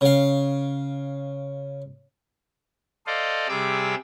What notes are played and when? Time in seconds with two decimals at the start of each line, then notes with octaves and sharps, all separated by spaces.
0.01 C#3 F5
3.07 A4 C5 D5 D#5 F5
3.49 C3 G3 G#4 D6 E6